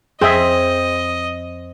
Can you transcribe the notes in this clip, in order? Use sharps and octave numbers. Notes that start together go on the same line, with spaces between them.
F2 C4 G#4 D#5 E5